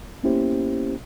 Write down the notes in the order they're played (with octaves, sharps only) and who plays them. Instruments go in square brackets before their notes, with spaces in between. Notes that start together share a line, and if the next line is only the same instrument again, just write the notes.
[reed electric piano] A#3 B3 C#4 E4 G4 C5